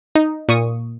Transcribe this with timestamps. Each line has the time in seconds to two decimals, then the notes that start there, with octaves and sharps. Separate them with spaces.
0.15 D#4
0.49 A#2 C#6 D#6